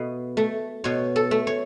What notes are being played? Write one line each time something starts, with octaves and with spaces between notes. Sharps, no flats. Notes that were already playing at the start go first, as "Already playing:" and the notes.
Already playing: B2 A3 D#5
A3
B2 C#5
A4
A3
C#5